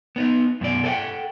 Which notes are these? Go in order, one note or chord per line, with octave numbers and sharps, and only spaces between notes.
B3 D4 D#4
F#2 B2 D5
A4 C5 D5 F#5 G5